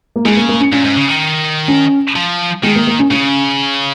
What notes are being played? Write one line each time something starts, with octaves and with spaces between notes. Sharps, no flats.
A#3
C#3 G#3
A#3
A#3
C#4
A#2 C#4
G#2
C#3
D#3
C#4
F3
D#3 G#3
A#3
A#3
C#4
C#3 C#4